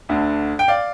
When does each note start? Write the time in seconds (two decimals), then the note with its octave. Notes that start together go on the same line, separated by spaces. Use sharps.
0.09 D2 D3
0.59 G5
0.68 D5 F5